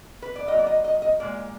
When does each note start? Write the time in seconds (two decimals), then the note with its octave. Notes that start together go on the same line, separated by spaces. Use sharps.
0.22 B4
0.36 D5
0.48 A#2 F#3 D#5
0.59 D5
0.67 D#5
0.85 D#5
1.02 D#5
1.20 A#2 G#3 D5